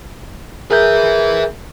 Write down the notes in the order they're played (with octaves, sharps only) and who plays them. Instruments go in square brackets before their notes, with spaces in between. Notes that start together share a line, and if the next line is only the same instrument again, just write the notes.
[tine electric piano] G#4 A#4 G6 [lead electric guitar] B4 E5